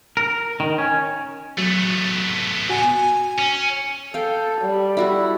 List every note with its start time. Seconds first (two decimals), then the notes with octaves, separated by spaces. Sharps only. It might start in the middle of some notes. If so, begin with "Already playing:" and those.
0.17 A#4
0.60 D#3
0.78 C#4
1.58 F#3 A3 B3
2.69 F#4 G#5
3.39 C#4
4.14 A4 F5 G5
4.62 G3
4.97 E4 F#4 A4